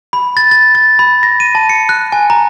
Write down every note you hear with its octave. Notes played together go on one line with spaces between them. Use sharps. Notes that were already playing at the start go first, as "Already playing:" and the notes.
B5
A6
A6
A6
B5
A#6
D#7
A5
C#7
F#6
G#5
A#5